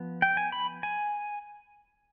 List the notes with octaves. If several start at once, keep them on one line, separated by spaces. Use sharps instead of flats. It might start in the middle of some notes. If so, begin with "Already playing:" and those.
Already playing: F3 B3
G5
G#5
B5
G#5